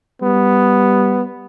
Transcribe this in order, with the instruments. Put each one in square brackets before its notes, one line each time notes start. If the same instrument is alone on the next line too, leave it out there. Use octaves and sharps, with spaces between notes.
[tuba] G3 [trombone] B3